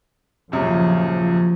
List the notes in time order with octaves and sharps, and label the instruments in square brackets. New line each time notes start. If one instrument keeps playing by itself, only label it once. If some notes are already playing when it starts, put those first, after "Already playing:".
[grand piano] D#1 F#2 C#3 [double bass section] F3